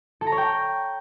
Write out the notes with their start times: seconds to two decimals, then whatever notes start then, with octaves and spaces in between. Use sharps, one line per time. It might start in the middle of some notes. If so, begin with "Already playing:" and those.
0.21 A4
0.27 A#5
0.32 C#5
0.38 G5